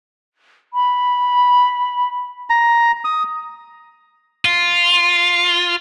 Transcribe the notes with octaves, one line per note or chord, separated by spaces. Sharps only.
B5
A#5
D#6
F4